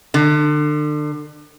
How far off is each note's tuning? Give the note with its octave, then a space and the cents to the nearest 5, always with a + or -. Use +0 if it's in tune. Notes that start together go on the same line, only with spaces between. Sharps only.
D3 +35